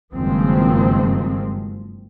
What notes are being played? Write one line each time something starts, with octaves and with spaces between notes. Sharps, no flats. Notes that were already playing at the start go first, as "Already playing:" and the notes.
F#1 G2 D#3 F3 G#3 C4